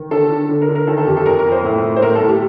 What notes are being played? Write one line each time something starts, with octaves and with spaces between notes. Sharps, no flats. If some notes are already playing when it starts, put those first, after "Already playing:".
Already playing: D#3
D3 A4
D3
D3
A#4
D3
A#4
D#3 A4
A4
F2 G4
A4
F2 A#4
A#4
F2
C5
A2
A2
C5
A2 A#4
A4
A2
G4